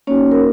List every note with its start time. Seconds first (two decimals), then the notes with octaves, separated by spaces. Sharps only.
0.07 A#3 C#4 D#4 F#4 C#5
0.31 A#4